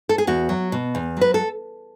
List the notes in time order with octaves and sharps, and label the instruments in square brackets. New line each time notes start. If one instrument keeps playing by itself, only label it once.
[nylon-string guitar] A4
G#4
E2 F#4
F#3
B2
E2
F#3 B4
A4